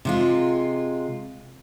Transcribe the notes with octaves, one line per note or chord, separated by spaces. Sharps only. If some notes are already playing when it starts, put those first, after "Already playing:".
C3 G#3 F4